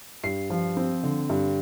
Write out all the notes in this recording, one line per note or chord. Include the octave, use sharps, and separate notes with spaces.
G2 C7
F3
C4
D3
G2